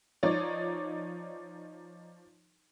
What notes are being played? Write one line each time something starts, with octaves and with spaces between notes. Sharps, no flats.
F3 D#4 C#5 D5